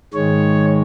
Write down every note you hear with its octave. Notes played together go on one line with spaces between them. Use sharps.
G#2 D#3 G#3 C#5